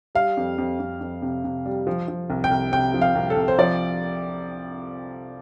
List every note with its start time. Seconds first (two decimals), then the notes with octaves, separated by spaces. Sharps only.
0.15 G3 F5
0.37 F2
0.58 F2
0.80 F2
1.01 F2
1.22 C3
1.44 C3
1.66 G3
1.87 F3
2.08 F3
2.30 C2
2.44 G5
2.51 C2
2.72 C3 G5
2.94 F3
3.01 F5
3.15 C2
3.30 A4
3.36 C2
3.48 C5
3.58 F3 D5